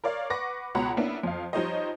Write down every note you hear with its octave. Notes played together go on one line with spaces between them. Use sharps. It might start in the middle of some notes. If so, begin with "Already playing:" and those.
A#4 C#5 D5 F5
B4 F#5 C#6 D6 A#6
C#2 B2 C#5 F#5 A#5 B5
A#3 B3 C#4 D4 E4
F2 F5
F3 G3 D#4 C5 C#5 D#5